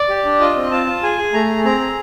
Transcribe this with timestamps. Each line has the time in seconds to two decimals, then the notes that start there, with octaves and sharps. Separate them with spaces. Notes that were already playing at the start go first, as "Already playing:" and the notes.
Already playing: D5
0.09 G4
0.25 D4
0.40 F4 D#5
0.56 C4
0.71 F4 A5
0.86 F4
1.03 G#4 G#5
1.18 G#4
1.33 A3 A#5
1.49 G#4
1.65 C4 A#5
1.80 G#4